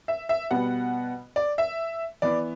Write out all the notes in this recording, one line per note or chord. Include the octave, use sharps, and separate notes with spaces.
E5
E5
B2 G3 B3 F#5
D5
E5
E3 B3 D5